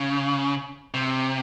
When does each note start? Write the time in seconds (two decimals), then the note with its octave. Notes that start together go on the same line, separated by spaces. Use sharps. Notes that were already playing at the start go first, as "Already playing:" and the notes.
Already playing: C#3
0.94 C3